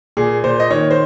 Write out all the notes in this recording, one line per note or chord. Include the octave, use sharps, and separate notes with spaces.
A#2 G#4
A#2 C5
D#5
D#3 C#5
C5